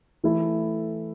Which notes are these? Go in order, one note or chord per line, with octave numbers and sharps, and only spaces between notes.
E3 A3 E4 A4